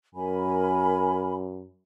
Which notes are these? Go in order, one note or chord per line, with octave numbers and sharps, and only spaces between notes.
F#2 A#4 G#5 B5